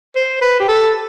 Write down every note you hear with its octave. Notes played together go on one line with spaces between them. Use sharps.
C5
B4
G4
A4